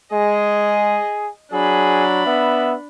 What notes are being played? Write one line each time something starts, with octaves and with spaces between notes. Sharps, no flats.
G#3 G#4 D#5
F#3 D4 G#4 B5
B3 E5